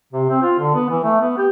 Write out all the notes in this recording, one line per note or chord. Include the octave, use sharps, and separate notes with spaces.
C3
C4
F4
D3
B3
E3
A3
B3
G4